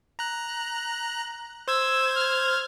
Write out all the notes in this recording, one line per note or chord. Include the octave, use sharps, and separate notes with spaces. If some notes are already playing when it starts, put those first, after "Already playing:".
A#5 F#6
C5 E6 G#6
F6